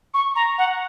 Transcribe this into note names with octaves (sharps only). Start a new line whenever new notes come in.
C#6
A#5
F#5